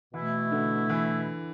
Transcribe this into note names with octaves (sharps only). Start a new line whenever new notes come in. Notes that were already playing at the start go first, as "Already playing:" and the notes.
B2 E3 A3 E4
D3
E3